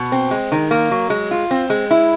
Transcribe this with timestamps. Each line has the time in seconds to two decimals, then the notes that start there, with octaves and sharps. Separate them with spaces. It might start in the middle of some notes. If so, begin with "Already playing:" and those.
Already playing: B2
0.12 C4
0.31 G#3
0.52 D#3
0.71 A#3
0.91 F#3
1.10 G#3
1.31 F4
1.51 C4
1.70 G#3
1.91 E4